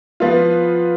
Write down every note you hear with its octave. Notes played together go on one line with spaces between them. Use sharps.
F3 B3 F4